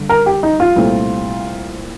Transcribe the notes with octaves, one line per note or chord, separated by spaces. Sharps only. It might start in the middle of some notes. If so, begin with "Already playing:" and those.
Already playing: G2 D3
A#4
G4
D#4
F4
C2 A#2 A3 C4